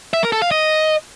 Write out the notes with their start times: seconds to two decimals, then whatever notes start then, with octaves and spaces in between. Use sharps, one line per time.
0.13 E5
0.23 A#4
0.32 A4
0.42 F5
0.51 D#5